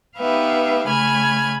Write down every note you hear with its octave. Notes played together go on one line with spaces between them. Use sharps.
B3 D#4 G4 B4 E5 F5
C#3 A3 G#5 B5 F6 G#6